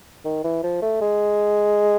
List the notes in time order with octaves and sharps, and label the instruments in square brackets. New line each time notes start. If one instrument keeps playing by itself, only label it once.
[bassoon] D#3
E3
F3
A3
G#3